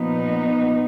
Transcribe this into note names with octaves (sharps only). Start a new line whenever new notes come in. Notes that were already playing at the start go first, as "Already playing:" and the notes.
Already playing: A#2 F3 B3 D#4